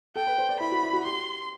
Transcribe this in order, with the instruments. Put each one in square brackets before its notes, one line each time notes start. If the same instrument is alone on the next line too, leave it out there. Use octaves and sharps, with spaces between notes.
[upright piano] A4 [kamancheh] G5
[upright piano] B4
C5
D5
[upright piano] E4 [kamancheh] B5
[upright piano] F#4
E4
F#4
[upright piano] G4 [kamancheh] C6